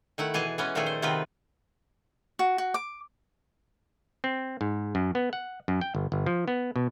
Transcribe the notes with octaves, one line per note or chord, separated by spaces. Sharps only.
D#3 A3 E4 F#5
B2 E3 G#4 G#5 A5
E3 G#3 B3 C#4
A#2 D#3 F3 A3 G#4 A4
C5
C3 D#3 B3 C4 F4 B4
F#4
F#4
D6
C4
G#2
F#2
B3
F#5
F#2
G5
G1
G1
F3
B3
B2